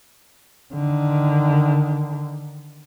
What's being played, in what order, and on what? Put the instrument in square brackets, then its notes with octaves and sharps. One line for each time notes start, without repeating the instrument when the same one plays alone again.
[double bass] D3 D#3